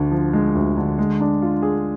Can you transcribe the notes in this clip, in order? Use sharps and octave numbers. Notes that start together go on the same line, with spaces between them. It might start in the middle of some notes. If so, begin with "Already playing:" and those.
Already playing: D2 D3
F3
G#3
D2
D3
G#3
D4
F4
G#4